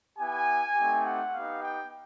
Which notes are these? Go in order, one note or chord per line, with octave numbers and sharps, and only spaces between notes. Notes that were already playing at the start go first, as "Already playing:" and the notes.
B3 E4 G4 G#5
A3 C4 D#4 G4
F#5
B3 D#4 G4 F5
G5